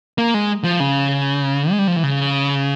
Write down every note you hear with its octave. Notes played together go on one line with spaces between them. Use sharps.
A#3
G#3
F3
C#3
G#3
G3
F3
E3
C#3